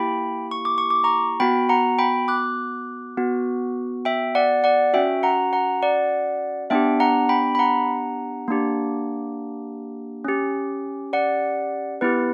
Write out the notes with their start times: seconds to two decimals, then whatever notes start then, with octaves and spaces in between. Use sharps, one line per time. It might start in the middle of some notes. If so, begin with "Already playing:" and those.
Already playing: A#3 E4 G4 G5 B5
0.51 C#6
0.65 D6
0.78 C#6
0.90 D6
1.04 A#5 C#6
1.40 B3 F#4 G5 B5
1.69 F#5 A#5
1.98 G5 B5
2.28 D6 F#6
3.17 B3 F#4
4.05 E5 G5
4.35 D5 F#5
4.64 D5 F#5
4.93 C#4 F#4 E5 G5
5.23 F#5 A#5
5.53 F#5 A#5
5.82 D5 F#5
6.70 B3 D4 G4 E5 G5
7.00 F#5 A#5
7.29 G5 B5
7.55 B5
7.59 F#5 A#5
8.48 A#3 D4 G4
10.25 C#4 G4
11.13 D5 F#5
12.01 B3 E4 G4 B4